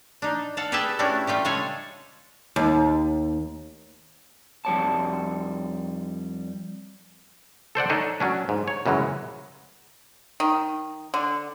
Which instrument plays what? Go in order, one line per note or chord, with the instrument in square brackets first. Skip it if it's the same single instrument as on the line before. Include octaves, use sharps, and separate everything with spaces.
[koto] D4 D#4
A4 F5 F#5 A5
G4 G#4 B4 E5 G5 A5
G3 A3 C#4 D4 E4 F#4
G3 A3 F4 G4
C#3 G#3 G#4 A4 C#5 G#5
[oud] D#2
[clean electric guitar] F2 G3 C#5 A5
[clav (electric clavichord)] A4 C5 D5 F#5
D4 D#4 A4 C#5 D#5
F#3 C#4 D4
G#2
C#5
F#2 C#3 E3 F#3 G#3
[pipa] D#3
D3